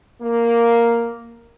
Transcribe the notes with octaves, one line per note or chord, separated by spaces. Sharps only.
A#3